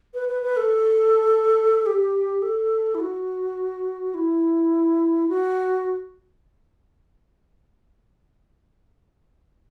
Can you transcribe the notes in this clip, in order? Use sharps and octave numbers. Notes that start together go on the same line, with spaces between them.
B4
B4
B4
A4
G4
A4
E4
F#4
E4
F#4